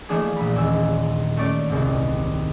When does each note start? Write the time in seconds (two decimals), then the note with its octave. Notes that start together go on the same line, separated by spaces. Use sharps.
0.09 E3 F3 A3 A#3 D4 G#4
0.36 A#1 B5
0.56 D#1 G#5 E6
1.37 A3 B3 C#4 D5
1.70 D#1 C2 G#2